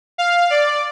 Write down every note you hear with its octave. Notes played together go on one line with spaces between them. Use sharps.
F5
D5